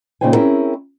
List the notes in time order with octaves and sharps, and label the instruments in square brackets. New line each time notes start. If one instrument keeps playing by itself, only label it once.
[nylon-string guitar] A#2 C#3 D#4 C5 G5 G#5
C4 C#4 E4 F#4 G#4 A#4